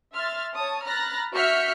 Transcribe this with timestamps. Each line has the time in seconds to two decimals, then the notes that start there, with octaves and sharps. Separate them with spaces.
0.14 E5 C6 F6 A6
0.54 C#5 A5 D#6
0.84 A#5 B5 F6 F#6 A6 A#6
1.33 F#4 E5 F6 G6 B6 C#7